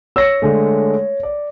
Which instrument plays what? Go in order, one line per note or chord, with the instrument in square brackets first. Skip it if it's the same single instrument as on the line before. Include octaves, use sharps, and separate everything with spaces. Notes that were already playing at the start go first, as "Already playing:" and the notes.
[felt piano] C#5 [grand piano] E6 A#6 C#7
[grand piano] D3 G#3 A3
D5